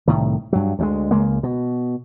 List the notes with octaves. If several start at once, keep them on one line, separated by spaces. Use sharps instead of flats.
C2 A2 D#3
G2 F#3
D2 F#3 G#3
C#2 G#3 A#3
B2